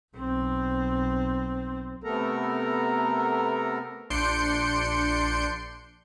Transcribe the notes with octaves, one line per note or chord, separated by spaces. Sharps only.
B1 C4
C3 A3 B3 A4 A#4 A#5
A#1 D4 C6 G6 C#7 D7